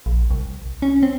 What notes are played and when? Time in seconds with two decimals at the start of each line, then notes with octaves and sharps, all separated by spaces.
0.06 A#1
0.31 C2
0.82 C#4
1.03 C4